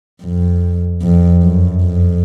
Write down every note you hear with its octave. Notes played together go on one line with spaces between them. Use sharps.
F2
F2
F#2
F2